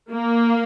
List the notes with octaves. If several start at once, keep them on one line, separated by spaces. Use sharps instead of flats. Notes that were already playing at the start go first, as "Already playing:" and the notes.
A#3